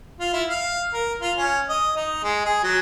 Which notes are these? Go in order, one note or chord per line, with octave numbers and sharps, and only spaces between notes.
F4
E4
F5
A#4
F4
C#4
D#5
D#4
G#3
G#4
F#3